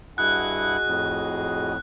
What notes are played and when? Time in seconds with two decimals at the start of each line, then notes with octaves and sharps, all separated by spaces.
0.18 G2 E4 F#4 G#4 D#5 F#5 F#6
0.87 F2 A2